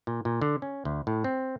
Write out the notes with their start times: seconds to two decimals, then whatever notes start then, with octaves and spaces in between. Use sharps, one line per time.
0.07 A#2
0.25 A#2
0.42 D3
0.62 C#4
0.85 D2
1.07 A2
1.24 C4